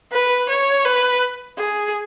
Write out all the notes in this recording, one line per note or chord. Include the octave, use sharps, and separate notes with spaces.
B4
C#5
B4
G#4